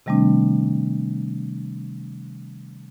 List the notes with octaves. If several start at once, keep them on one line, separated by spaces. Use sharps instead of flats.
C3 D#3 G3 A3 C4 D4